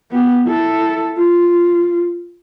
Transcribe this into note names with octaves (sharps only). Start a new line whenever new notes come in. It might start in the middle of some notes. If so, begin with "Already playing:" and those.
B3 G4
E4 A4
F4